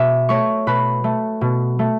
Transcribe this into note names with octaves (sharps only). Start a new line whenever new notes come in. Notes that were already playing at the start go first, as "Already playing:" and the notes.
Already playing: B2 E5
A3 C#5 C#6
B2 B4 B5
A3
B2
A3